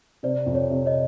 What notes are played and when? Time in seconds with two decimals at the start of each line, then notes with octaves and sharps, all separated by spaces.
0.23 C3 C5 D5
0.46 F2
0.55 C#5
0.70 C3
0.86 C#5 D#5